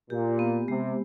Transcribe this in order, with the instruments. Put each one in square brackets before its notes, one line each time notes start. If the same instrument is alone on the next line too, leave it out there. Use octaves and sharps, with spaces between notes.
[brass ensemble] A#2 [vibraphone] G4
[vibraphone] B3
[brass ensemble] C3 [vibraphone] G#3